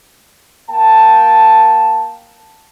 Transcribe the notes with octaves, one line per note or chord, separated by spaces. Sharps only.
A#3 G5 A5